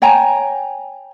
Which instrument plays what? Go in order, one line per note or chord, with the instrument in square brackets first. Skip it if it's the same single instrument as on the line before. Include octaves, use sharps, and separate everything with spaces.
[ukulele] C#5 G5 G#5 A#5